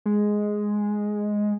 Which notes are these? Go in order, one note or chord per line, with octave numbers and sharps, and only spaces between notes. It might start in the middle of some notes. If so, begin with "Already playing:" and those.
G#3